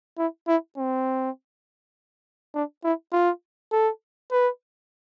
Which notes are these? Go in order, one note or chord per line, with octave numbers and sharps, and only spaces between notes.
E4
E4
C4
D4
E4
F4
A4
B4